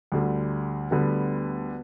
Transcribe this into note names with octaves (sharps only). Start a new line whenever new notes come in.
D2 D3 G3
D2 D3 G3 B3